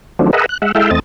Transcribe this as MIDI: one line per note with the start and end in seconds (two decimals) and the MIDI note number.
0.19 0.31 51
0.19 0.31 53
0.19 0.31 54
0.19 0.31 57
0.19 0.31 60
0.19 0.31 62
0.33 0.46 68
0.33 0.46 70
0.33 0.46 71
0.33 0.46 75
0.33 0.46 76
0.33 0.46 78
0.49 0.58 90
0.62 0.72 56
0.62 0.72 76
0.62 0.72 78
0.75 0.91 56
0.75 0.91 64
0.75 0.91 69
0.75 0.91 76
0.75 0.91 77
0.75 0.91 79
0.91 1.00 40
0.91 1.00 57
0.91 1.00 60
0.91 1.00 75
0.91 1.00 93